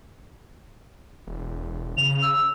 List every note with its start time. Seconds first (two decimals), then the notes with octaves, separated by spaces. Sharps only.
1.27 E1
1.97 C#3 F7
2.22 E6